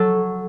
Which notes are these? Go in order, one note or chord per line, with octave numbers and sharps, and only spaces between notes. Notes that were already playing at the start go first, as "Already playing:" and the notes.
Already playing: F#3 A4